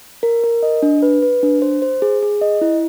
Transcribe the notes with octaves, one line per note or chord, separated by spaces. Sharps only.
A#4
A#4
D#5
D4
B4
B4
D4
C5
C5
G#4
G#4
D#5
E4